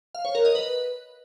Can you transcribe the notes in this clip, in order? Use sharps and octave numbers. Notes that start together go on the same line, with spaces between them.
F5
C#5
A#4
D#5
B4